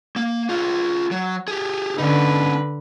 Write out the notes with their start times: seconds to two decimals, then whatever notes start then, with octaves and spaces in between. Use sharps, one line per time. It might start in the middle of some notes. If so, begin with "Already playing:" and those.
0.16 A#3
0.49 F4 G#4
1.11 F#3
1.48 G4 G#4
1.98 D3 C#4 D#4 B4